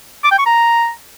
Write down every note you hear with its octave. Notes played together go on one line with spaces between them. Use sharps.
D6
G5
C#6
A#5